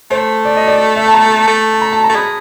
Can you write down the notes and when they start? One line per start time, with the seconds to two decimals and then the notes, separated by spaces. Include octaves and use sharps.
0.11 A3 C5
0.45 D5
0.57 D#5
0.68 D5
0.96 E5
1.08 A5
1.14 A#5
1.48 A3
1.74 A5
1.82 A#5
1.93 A5
2.04 A#5
2.10 A3
2.15 G#3 B5